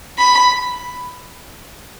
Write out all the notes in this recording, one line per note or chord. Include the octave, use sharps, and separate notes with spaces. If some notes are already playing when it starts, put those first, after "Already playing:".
B5